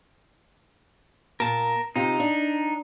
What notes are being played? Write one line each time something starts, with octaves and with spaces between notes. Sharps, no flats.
A#2 A#4 A5
C3 D#4 F4 C5
D4